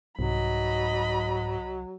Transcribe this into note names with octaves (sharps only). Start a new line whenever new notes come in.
C2 G#2 F#3 D#5 B5